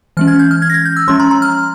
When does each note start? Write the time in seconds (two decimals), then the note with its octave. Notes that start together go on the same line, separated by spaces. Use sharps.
0.17 E3 G#3 C#4 F6
0.28 G#6
0.39 G6
0.51 F6
0.62 G#6
0.70 A#6
0.74 G#6
0.85 G6
0.97 E6
1.08 F3 G#3 C#4 C6
1.20 A#5
1.31 A#5
1.42 F6